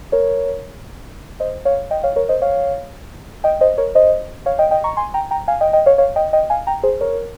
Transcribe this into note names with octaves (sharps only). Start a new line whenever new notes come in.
A#4 C#5
C5 D#5
C#5 F5
D#5 G5
C#5 F5
A#4 C#5
C5 D#5
C#5 F5
D#5 G5
C5 D#5
A#4 C#5
C5 D#5
C#5 F5
D#5 G5
D#5 G5
A#5 C#6
G#5 C6
G5 A#5
G5 A#5
F5 G#5
D#5 G5
D#5 G5
C#5 F5
C#5 F5
D#5 G5
D#5 G5
F5 G#5
G5 A#5
G#4 C5
A#4 C#5